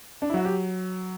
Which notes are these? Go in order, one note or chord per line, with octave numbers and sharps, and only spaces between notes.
D4
E4
F#3 F#4
G4